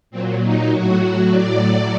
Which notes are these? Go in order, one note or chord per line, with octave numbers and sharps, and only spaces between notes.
A#2 F#3 C4
D#4
A2 F#3 F#4
A2 F#3 D5